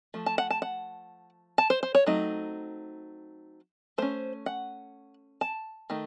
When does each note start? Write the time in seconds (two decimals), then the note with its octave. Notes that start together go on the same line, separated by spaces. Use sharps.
0.14 F3 A3
0.26 A5
0.38 F#5
0.51 A5
0.62 F#5
1.58 A5
1.70 C5
1.83 C5
1.95 C#5
2.07 F#3 A3 C4 D#4
3.98 A3 C#4 C5
4.46 F#5
5.41 A5
5.90 D#3 A3 D#4